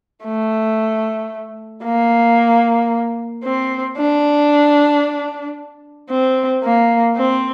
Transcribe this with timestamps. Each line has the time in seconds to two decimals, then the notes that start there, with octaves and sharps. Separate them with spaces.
0.24 A3
1.84 A#3
3.44 C4
3.97 D4
6.10 C4
6.64 A#3
7.17 C4